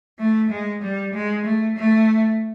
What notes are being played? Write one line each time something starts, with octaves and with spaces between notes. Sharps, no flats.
A3
G#3
G3
G#3
A3
A3